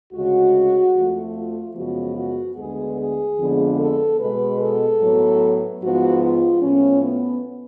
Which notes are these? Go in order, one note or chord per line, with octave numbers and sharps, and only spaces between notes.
D2 C#3 G#3 F#4
F2 F3 A3
F4
F#2 C#3 F3 G#3 B3 F#4
F#4
D2 D3 G#3 B3 G#4
G#4
F2 D3 F3 G#3 B3
A4
B2 G#3 B3 B4
A4
A2 F#3 B3
G#2 F3 B3 F#4
F4
A2 F3 B3 C#4
B3